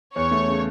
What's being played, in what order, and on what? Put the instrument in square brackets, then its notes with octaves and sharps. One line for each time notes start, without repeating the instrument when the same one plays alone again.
[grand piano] E2 [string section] C#5
[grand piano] A3
C#3